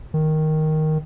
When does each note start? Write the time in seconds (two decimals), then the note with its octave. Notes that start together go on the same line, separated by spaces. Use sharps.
0.14 D#3